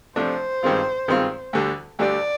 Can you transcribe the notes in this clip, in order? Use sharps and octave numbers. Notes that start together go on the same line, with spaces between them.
C3 F3 A3 D4 C5
G2 D#3 G#3 C4 F4
G2 D#3 G#3 C4 F4
D2 D3 G3
D2 D3 G3 D5